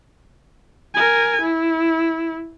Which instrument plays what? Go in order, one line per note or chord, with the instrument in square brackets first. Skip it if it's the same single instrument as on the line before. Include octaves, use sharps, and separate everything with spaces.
[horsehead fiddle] A#4 G#5
E4